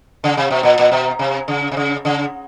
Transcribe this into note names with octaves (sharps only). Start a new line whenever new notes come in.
C#3
C3
B2
A#2
A#2
B2
C3
C#3
C3
C#3
C#3